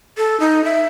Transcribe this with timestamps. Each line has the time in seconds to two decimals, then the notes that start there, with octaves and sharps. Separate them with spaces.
0.18 A4
0.40 D#4
0.65 E5